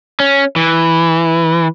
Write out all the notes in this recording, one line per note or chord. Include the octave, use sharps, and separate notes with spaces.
C#4
E3